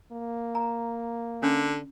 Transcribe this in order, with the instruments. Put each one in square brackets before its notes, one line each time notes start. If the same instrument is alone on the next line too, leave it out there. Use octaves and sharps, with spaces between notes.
[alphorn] A#3
[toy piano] A#5
[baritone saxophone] D3 [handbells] C#4